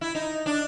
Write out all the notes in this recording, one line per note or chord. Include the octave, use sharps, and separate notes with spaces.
E4
D#4
D4